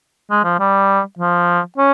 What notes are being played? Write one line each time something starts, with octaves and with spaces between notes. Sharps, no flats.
G#3
F3
G3
F3
C#4